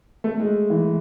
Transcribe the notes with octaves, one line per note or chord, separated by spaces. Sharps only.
A3
G#3
E3